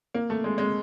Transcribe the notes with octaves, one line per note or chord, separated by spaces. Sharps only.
A#3
A3
G#3
G#3